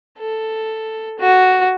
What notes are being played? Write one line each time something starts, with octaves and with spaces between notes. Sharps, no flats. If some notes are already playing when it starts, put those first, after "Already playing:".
A4
F#4